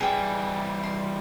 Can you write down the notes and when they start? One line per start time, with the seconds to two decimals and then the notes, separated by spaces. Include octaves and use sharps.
0.01 E3 G3 G#4 G5
0.83 C6